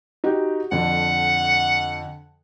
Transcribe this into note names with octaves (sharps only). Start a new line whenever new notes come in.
D#4 F#4 G4
F2 D3 F#5